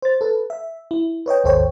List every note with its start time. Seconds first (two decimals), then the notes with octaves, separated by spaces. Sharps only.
0.02 C5 A6
0.21 A4 B4
0.50 E5
0.91 E4
1.26 B4 C#5 D#5 G5
1.44 G#1 D#2 A4 C5 C#5 G5